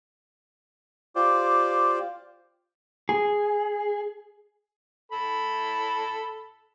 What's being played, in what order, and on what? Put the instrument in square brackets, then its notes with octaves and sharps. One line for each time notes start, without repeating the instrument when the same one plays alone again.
[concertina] F4 G4 C5 D5
[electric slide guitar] G#4
[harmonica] A4 B5